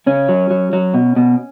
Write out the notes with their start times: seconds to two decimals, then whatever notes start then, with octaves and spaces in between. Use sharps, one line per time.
0.06 C#3 C#4
0.29 F#3
0.51 F#3
0.73 F#3
0.94 B2
1.16 B2